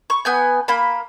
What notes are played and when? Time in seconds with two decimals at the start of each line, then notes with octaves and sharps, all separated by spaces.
0.10 C#6
0.25 B3 G#5 G6
0.68 A#3 B5